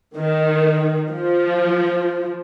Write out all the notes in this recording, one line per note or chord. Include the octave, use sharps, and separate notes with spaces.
D#3
F3